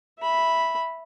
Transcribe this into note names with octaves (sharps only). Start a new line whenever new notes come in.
E5 B5